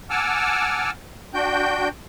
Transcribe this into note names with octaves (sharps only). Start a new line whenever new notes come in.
F#5 G#5 A5 D6 E6 F6
D4 F#4 G5 G6